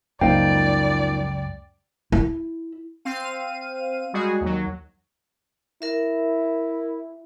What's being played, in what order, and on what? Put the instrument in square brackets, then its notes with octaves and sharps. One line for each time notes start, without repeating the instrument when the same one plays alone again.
[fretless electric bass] C#2 F#2 [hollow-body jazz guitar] F3 A#3 D#4 [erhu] D5 [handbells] G5
[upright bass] E4
[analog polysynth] C4 F5 D#7
G3 G#3 F#4 G#4
D#2 F#3
[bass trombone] E4 [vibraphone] A#4 E5